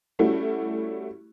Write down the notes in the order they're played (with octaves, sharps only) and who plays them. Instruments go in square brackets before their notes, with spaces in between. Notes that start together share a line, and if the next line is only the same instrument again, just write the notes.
[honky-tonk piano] G3 A3 C#4 E4 F#4